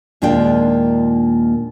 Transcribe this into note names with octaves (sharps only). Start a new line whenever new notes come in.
D#2 A#2 G#3 D4 F4 G5